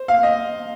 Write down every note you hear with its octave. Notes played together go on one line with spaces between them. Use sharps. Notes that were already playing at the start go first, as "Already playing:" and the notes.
Already playing: C5
F5
D#5